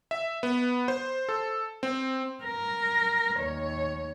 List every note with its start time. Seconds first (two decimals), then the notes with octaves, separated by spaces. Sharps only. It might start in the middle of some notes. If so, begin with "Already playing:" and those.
0.11 E5
0.43 B3
0.88 C5
1.29 A4
1.83 C4
2.44 A#4
3.38 D#2 C#5